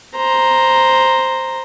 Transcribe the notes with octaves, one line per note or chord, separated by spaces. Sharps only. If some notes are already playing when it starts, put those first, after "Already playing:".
C5 A#5